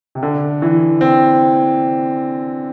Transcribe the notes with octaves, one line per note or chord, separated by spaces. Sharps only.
C3
D3
E3
C4